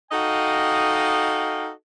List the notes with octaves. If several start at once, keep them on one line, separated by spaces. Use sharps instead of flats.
D#4 F#4 A4 D#5 F5 G5